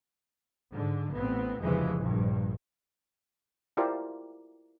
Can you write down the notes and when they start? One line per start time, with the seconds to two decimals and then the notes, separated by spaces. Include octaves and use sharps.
0.73 G#2 D3
1.14 A1 B3 C4
1.62 F1 D2 C#3 E3 F3 G#3
1.97 A#1 G2
3.77 E4 F4 G4 A#4 C5 D5